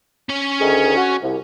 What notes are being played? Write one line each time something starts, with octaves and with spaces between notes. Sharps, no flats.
C#4 C#5
D2 D#3 G#4
F#4
C2